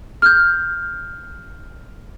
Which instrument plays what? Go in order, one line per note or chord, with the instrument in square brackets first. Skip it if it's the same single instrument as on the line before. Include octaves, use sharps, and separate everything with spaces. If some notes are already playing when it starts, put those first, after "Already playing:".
[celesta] F6 G6